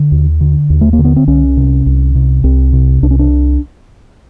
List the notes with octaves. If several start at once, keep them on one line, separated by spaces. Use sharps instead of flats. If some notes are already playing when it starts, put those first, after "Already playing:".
Already playing: D3
D#2
D3
D#2
A3
A#3
D3
B3
C4
C2 C#4
C3
C2
C3
C2 C4
C3
C2 D4
C#4
D4